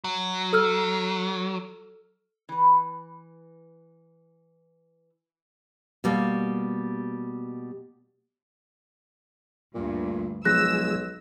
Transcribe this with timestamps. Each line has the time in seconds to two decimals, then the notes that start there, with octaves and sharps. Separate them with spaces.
0.04 F#3
0.53 A4 E6 F6
2.49 E3 B4
6.04 B2 G3 A#3
9.74 D2 G2 A#2
10.45 B1 F3 G#3 G#4 E6 F#6 A#6